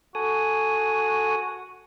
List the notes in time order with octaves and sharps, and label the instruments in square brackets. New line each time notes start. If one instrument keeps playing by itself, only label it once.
[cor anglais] F#4 [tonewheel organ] A4 G#5 D#6